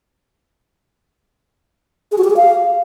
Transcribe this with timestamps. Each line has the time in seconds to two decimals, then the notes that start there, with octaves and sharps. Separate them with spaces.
2.12 G#4
2.18 F#4
2.24 G4
2.30 G#4
2.36 F5